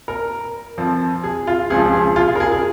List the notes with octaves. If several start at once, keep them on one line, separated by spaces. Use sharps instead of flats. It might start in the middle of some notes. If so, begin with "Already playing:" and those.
A#4
F2 F3
G#4
F4
C#2 C#3 F3 G#4
G#4
F4
G#4
A#4
G#4
G#4